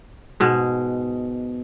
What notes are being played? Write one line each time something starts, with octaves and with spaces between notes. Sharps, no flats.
G#2 B2 G#3